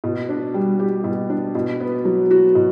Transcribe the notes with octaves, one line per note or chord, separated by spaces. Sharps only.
B2
D4
G3
G4
B2
D4
B2
B3
F#3
F#4
B2